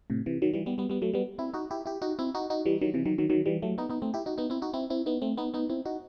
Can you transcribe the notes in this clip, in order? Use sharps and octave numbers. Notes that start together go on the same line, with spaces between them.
A2 C3
C3 E3
D#3 F#3
E3 G3
G3 B3
G3 B3
G3 B3
F#3 A3
G3 B3
C4 E4
D#4 F#4
E4 G4
E4 G4
D#4 F#4
C4 E4
D#4 F#4
D#4 F#4
E3 G3
D#3 F#3
C3 E3
D#3 F#3
D#3 F#3
D#3 F#3
E3 G3
F#3 A3
B3 D#4
B3 D#4
A3 C4
E4 G4
D#4 F#4
B3 D#4
C4 E4
D#4 F#4
C4 E4
C4 E4
B3 D#4
A3 C4
B3 D#4
B3 D#4
C4 E4
D#4 F#4